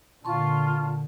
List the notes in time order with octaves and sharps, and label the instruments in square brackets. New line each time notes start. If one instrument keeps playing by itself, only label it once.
[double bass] A#2 D3 [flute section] F4 [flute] A5 [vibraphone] C6 C#6